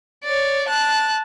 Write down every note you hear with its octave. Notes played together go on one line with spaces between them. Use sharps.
C#5 D5
A5 F#6